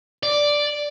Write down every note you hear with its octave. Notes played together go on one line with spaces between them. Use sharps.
D5